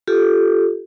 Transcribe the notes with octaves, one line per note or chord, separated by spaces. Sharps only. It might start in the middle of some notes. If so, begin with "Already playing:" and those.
F4 G4 A4